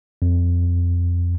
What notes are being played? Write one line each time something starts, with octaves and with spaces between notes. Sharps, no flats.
F2